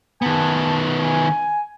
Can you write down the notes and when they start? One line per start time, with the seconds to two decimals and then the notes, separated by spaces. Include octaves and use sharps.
0.22 D#3 B3 G#5 A5
0.99 G#5